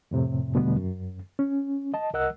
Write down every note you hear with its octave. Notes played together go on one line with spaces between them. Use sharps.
F2 A2 C3
E2 B2 D3 G3 A3 B3
F#2
C#4
D#5 A5
C2 A#4 D#5 F#5 E6 F#6